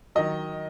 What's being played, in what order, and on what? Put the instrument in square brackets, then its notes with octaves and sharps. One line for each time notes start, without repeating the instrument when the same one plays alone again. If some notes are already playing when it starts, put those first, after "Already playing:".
[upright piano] D#3 F#3 D#5